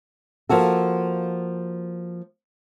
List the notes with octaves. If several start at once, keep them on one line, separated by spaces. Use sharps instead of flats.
F3 A#3 F#4 A4